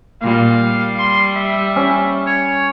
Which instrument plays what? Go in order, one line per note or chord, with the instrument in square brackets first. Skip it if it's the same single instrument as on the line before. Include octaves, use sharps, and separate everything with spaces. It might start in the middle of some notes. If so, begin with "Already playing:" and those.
[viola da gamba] A#2 G3 [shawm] F5
[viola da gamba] G3
[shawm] C6
E5
[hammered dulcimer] C#4
[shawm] C#5